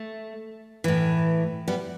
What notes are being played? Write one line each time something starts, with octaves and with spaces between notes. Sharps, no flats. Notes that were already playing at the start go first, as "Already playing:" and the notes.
Already playing: A3
A2 E3
G3 B3